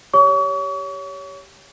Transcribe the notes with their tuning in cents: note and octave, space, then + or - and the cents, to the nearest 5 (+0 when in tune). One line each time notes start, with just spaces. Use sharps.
G4 +0 C#5 +15 C#6 +40